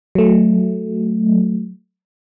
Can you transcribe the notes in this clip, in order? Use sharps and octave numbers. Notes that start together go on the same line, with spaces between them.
F#3 A3